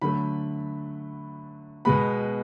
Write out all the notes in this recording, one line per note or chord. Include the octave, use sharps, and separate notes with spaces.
D3 F#3 A3 B5
B2 G#3 B3 B5